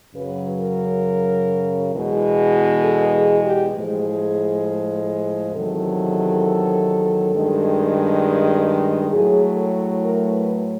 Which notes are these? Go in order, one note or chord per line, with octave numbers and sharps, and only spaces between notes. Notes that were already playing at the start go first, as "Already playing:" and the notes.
F#2 C#3 F#3 B4
A#4
E2 B2 G#3
A4
G#4
G4
A2 F3 G#3 G#4
E2 C3 D#3 F#3 A4
G2 D#3 G#3
A2 F#3 A3 G#4
A4
A#4
B4